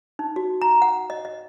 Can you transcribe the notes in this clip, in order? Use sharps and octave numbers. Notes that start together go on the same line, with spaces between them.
D#4
F#4
A#5
F#5
D#5
D#5